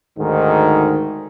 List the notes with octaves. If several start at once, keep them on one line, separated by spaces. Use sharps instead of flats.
D2 G#2 D#3